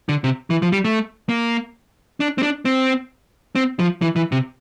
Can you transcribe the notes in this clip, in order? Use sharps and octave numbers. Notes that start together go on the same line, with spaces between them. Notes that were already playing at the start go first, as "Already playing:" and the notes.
D3
C3
E3
F3
G3
A3
A#3
D4
C4
D4
C4
C4
F3
E3
E3
C3